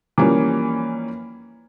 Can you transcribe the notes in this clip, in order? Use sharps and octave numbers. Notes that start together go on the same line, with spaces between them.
E3 F3 G3 A#3 C#4